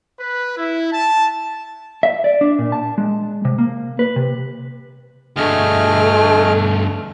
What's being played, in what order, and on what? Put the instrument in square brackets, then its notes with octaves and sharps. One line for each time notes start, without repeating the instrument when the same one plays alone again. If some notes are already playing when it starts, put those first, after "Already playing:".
[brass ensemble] B4
E4
A5
[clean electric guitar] E5
D5
D4
A#2
A5
G#3
C3
A#3
B4
C3
[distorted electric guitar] D2 G2 [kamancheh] A3 [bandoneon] G#4 D#5 F6